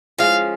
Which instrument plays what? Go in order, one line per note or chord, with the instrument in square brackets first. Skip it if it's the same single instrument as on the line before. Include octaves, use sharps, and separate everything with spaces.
[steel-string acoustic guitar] F3 G#3 C#4 [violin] F5